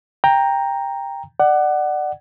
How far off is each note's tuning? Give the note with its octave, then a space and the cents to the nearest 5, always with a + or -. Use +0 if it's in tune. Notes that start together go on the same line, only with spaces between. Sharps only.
G5 +15 A#5 +0
D5 +25 F#5 +20